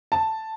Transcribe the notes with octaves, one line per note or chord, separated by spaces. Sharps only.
A5